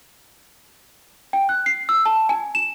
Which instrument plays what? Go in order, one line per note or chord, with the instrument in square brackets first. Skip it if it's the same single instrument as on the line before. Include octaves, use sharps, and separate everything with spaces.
[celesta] G5
F#6
C7
E6
A5
G#5
E7